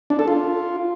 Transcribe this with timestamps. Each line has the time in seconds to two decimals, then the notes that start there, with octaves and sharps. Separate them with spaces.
0.10 D4
0.19 A4
0.28 F4